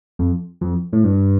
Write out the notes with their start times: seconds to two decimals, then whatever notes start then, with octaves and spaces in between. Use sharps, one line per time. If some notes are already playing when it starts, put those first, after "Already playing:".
0.19 F2
0.61 F2
0.93 A2
1.04 G2